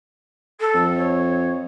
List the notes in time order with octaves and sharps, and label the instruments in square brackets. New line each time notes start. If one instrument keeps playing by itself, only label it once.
[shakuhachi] A4
[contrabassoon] F2
[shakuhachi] C#5